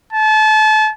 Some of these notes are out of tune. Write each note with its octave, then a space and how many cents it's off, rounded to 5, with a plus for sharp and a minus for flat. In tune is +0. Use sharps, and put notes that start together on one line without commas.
A5 -30